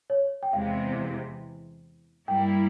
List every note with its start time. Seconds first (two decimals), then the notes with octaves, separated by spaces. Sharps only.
0.10 C#5
0.43 G5
0.53 E2 C3 E3 G#3 F5
2.28 G2 G3 A#3 E4 G5